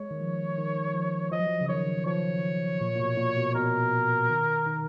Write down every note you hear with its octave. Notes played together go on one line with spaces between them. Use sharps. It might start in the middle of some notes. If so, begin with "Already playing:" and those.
Already playing: G#3 C#5
D#3
F3
D#3
F3
F3 D#5
F#3
F3
C#3
D#3 C#5
F3 C#5
A#2
A#2
B2
A#2
B2
B2 A#4
D#3
D#3